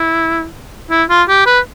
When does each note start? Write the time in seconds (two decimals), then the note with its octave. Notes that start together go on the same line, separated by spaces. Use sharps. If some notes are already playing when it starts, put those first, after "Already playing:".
Already playing: E4
0.90 E4
1.10 F4
1.28 G4
1.46 B4